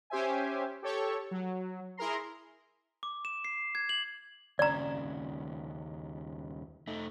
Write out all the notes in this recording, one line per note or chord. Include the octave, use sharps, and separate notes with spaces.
C#4 G4 C5 E5 G#5
G4 A4 C#5 C#6
F#3
E4 G#4 A#4 A#5 C6
D6
E7
C7
G#6
F#7
D#2 C#3 D5 A#5
A3 D#4